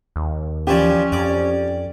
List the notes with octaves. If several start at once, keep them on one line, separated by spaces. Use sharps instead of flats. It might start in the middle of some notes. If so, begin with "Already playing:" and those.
D#2
E3 F3 C#4 G4 D5
F2 D5